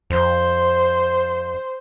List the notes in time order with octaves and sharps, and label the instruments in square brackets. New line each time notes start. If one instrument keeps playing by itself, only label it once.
[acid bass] F2 [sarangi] C5